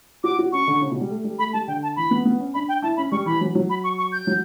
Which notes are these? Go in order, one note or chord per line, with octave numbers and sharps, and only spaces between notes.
F#4 D6
F#4
C#4 C#6
D3
C#3
B2
G3
A3
G3
A3 B5
G3 A5
D3 G5
A5
E3 B5
B3
B3
C#4
D4 B5
G5
E4 A5
C#4 B5
G3 C#6
E3 B5
F#3
F#3
B5
C#6
C#6
G6
F#3